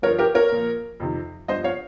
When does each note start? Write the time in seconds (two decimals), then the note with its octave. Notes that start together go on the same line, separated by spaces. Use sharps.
0.02 G2 A#4 C#5
0.06 F3
0.18 G4 A#4
0.35 A#4 C#5
0.52 A#2 F3
1.00 F2 C3 D#3
1.48 G2 F3 C5 D#5
1.64 C#5 F5